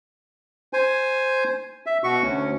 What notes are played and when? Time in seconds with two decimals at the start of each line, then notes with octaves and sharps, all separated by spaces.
0.73 C5 G#5
1.86 E5
2.04 B2 F#4 C#6
2.23 D2 C#4